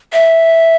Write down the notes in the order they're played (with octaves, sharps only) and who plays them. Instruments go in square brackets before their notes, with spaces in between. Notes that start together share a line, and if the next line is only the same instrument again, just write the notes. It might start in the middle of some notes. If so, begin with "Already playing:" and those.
[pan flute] E5